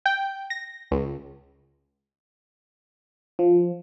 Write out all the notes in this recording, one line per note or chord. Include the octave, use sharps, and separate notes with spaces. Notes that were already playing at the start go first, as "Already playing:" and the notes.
G5
A#6
C#2
F3